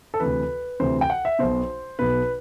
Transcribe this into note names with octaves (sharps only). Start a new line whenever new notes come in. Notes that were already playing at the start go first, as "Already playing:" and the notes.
A4
D2 C3 E3 B4
D2 C3 E3 C5
G5
F#5
E5
B1 B2 C5
B1 B2 B4